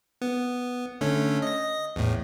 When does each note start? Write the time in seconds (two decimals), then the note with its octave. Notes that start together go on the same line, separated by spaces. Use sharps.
0.22 B3
1.01 D3 A3 C#4
1.42 D#5 A#6
1.96 E2 A2